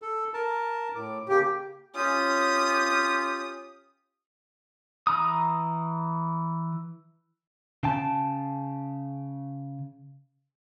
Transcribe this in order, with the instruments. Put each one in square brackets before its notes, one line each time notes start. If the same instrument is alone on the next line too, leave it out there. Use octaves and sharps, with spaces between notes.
[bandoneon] A4
A#4 A5
A2 D6
[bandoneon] C#3 A#3 [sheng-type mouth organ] G4
[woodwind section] C#4 F4 G4 [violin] D#6
[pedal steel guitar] E3 A#5 D#6
[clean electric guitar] C#3 G5 A5